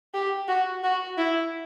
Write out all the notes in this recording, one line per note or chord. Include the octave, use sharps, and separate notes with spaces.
G4
F#4
F#4
E4